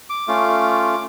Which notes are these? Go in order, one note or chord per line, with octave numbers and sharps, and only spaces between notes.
D6
A3 C#4 F4